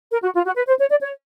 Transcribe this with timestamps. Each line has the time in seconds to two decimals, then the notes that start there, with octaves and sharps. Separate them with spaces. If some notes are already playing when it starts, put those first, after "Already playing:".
0.11 A#4
0.23 F#4
0.34 F4
0.45 F#4
0.55 B4
0.67 C5
0.79 C#5
0.90 D5
1.01 C#5